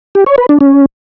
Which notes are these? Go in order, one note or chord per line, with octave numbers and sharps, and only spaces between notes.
G4
C#5
B4
D4
C#4